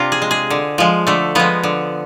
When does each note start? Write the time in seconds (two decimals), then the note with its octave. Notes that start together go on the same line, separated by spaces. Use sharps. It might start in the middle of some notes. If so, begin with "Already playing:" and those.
Already playing: C3 D4 F4
0.12 G#4
0.22 G#3
0.31 G#4
0.50 D3
0.78 F3 G#3
1.07 D3 A3
1.35 F3 G#3 B3
1.63 D3